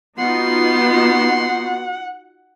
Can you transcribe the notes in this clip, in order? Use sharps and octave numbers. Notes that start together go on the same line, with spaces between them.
B3 D#4 F4 F#4 F#5 C6